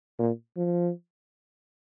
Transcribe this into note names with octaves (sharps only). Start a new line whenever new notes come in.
A#2
F3